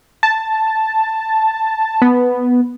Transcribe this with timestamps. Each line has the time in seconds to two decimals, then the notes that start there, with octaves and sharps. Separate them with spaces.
0.23 A5
2.02 B3